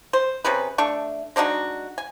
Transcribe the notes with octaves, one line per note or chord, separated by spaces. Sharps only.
C5
C3 C#4 G#4 B4
A3 D4 C#6
G#3 D4 D#4 F#4
G#5